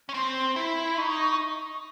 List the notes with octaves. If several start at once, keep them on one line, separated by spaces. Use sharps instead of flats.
C#4
C4 C6
C6
E4 B5
D#4 C#6